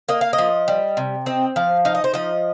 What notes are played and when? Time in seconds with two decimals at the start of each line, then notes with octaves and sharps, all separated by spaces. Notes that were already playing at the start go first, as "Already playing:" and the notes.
0.09 A#3 D#5
0.21 F5
0.33 D#5
0.38 F3
0.68 G3
0.97 C3
1.26 C4 D#5
1.56 F3 F5
1.85 D#4 F5
1.95 D#5
2.04 C5
2.14 F3 D#5